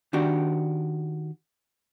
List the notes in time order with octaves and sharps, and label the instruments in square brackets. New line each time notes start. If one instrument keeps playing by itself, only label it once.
[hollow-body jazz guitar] D#3 D4 F#4 G4